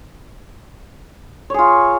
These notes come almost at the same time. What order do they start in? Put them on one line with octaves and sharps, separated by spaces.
C#5 G#4 F4